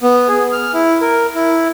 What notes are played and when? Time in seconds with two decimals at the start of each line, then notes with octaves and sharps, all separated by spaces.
0.01 B3
0.28 G#4
0.52 F6
0.74 E4
1.01 A#4
1.35 E4